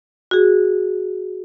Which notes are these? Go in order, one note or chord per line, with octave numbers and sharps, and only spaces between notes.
F#4 G#4